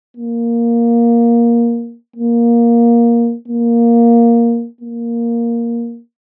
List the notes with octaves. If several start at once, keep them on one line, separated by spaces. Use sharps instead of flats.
A#3
A#3
A#3
A#3